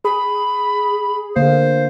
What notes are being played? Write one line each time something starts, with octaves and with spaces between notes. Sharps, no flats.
G#4 B5
D3 A#3 C5 F5